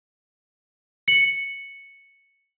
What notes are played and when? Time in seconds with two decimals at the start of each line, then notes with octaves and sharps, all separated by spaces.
1.08 C#7 F#7